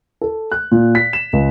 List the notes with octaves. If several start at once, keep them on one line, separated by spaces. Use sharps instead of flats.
A4
F#6
A#2
B6
E7
C#2